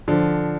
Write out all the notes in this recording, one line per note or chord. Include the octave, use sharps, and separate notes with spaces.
D3 F3